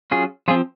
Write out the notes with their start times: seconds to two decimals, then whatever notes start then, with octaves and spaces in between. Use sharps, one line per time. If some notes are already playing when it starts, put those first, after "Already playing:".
0.11 F#3 C#4 F4 G#4
0.48 F3 C4 F4 G#4